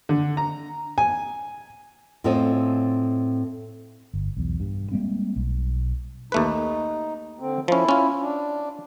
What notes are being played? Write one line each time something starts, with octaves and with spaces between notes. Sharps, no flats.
D3
A#5
G#5
A2 C4 C#4 F4 A4 D#5
G1
B1 E2
G2
G3 G#3 A#3 C4
B1
D#2 A3 D#4 B4
D3 C4
F3 C#4 E4
C#4 F4
D4